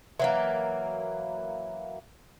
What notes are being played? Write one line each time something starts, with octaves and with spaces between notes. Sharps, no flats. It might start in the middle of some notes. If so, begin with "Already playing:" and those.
E3 F#3 A#3